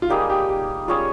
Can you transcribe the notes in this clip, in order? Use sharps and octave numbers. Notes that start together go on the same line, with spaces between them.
F4
G3 A#3 D#4 G4 G#4
G4
G4
G3 C#4 F4 G#4 C#5